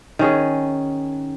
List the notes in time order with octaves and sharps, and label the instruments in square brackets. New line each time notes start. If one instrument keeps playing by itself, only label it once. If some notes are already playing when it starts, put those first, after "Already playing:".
[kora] D#3 C#4 G#4